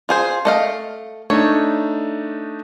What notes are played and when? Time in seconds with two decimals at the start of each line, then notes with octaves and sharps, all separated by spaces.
0.09 F4 G#4 C5
0.45 A3 D#5 F5
1.30 A3 D4 D#4 C#5